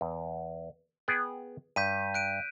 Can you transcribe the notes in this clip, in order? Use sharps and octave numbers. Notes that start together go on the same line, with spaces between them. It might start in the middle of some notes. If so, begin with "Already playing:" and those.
E2
B3 G#4 G5
G2 G6 B6 D#7
F#6 D7 D#7